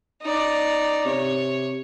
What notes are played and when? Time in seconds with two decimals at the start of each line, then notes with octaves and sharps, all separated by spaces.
0.22 D#4 D5
1.05 C3 C#5